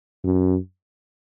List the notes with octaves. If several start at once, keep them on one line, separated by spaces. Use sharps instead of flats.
F#2